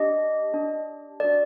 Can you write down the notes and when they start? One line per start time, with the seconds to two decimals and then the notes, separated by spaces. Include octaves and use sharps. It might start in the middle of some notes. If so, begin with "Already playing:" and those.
Already playing: D4 G4 D#5
0.52 D4 G4
1.20 D4 F#4 A4 D5